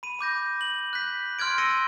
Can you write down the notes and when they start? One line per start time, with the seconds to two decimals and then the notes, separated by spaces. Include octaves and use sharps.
0.03 B5 D#7
0.19 B5 D6 G6 A#6
0.61 F#7
0.93 F#6 G6 B6
1.39 C6 F6 F#6 G#6 D7
1.58 E6 A#6 C#7 D#7 G7